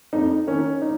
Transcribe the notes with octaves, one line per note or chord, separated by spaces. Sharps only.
F2 D#4
D#3 C#4
D#4